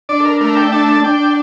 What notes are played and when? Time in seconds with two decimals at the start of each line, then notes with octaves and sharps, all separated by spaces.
0.09 D4 D5
0.20 A4
0.25 A#4
0.41 A3 A#4
0.57 G5
0.72 D4 A5
0.88 A5
1.04 D4 G5